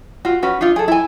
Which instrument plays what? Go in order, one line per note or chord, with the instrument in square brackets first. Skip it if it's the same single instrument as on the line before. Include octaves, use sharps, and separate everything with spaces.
[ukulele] F4 F#4
C#4 F#4 B4
D4 D#4 F4
G#4 A4
E4 G#5